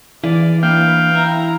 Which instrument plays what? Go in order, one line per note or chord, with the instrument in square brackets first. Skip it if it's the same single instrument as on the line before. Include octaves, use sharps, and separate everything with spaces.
[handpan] E3 [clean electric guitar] E4 G#4 F5 [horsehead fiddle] D5
[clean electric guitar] A#3 D4 [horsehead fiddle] B4 [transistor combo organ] F5 G5
[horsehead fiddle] E4 A#5 [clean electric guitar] E5